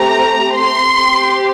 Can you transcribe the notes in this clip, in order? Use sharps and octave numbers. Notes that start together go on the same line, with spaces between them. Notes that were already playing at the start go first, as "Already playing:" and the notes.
Already playing: A3 C4 G4 A#5
C6
C4 G4